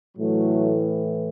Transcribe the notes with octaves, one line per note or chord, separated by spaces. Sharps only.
A2 E3 F#3 A3